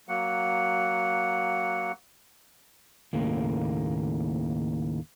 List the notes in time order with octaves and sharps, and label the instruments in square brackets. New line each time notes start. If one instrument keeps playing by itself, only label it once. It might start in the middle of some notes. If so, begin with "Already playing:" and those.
[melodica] F#3 A#3 F#5
[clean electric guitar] D#2 A2 C#3 A#3